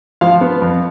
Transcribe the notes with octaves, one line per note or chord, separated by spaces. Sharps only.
F3 F5
B3
F2